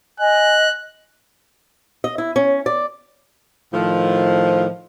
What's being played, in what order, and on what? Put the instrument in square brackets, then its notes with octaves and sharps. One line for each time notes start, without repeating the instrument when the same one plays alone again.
[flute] D#5 [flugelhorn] G#5 [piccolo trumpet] F#6
[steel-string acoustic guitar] D#5
E4
C#4
D5
[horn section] A2 D#3 F3